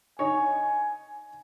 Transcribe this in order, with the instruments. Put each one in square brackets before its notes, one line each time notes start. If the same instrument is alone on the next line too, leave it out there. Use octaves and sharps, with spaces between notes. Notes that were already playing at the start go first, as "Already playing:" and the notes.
[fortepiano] D#4 C#5 [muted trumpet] G#5